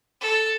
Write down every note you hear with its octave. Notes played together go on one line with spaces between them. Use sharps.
A4